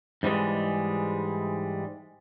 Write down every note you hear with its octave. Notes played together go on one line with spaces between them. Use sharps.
G#2 E3 G3 G#3